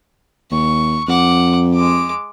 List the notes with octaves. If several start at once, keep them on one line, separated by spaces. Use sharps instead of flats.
D#2 C#6
F2 F#5 D6
G#3 D6